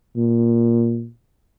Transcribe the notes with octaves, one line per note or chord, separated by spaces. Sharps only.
A#2